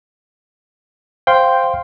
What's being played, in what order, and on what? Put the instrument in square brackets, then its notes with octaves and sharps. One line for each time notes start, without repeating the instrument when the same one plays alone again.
[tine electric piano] C5 F5 C6 [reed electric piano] G5